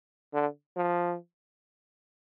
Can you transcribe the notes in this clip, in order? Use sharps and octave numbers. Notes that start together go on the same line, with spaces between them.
D3
F3